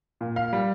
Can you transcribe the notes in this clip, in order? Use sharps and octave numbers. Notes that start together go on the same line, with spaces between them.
A#2
F5
G3